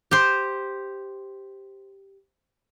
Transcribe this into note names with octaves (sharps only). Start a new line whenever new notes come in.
G4 C5